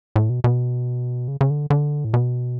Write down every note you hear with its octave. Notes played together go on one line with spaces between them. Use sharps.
A2
B2
B2
C#3
C#3
D3
D3
A2
B2